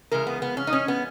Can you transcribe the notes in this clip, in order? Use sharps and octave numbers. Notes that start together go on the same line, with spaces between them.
C#3 E3 G#3 A#4
B3
B3
C#4
D#4
C#4
B3